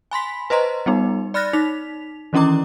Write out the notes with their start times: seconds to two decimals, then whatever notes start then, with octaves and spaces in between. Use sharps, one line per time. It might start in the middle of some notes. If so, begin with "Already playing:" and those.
0.11 G#5 B5 C6 B6
0.50 B4 C5 D#5 A#5 C6
0.86 G3 B3 D#4
1.34 D5 B5 F6 F#6 A6 A#6
1.53 D#4 B6 F7
2.33 D#3 E3 C#4 E4 A#5 D6